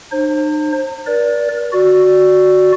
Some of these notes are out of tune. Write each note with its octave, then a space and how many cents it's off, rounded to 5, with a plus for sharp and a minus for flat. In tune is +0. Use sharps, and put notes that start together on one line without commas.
D#4 -45 C5 +30
A#4 +45 D5 -10
F#4 +0 D5 +0